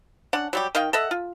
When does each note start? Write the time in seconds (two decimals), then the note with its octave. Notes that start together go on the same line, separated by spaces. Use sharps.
0.33 C#4 D4 F#5
0.53 F#3 G3 G4
0.75 D#3 D#5 F5 G5
0.93 A4 D#5 E5 F#5
1.11 F4